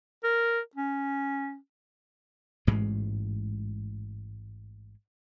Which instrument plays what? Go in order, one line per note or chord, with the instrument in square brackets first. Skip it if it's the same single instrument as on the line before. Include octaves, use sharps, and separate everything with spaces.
[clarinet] A#4
C#4
[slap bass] A1 G#2 B2 G#3